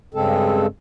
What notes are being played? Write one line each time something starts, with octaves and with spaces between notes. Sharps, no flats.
G2 C#3 G#3 C4 A4